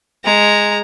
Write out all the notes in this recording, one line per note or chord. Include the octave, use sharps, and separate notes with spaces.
G#3 A#5